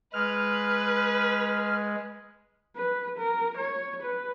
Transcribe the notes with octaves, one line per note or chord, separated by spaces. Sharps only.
G#3 B4 F6
B4
A#4
C#5
B4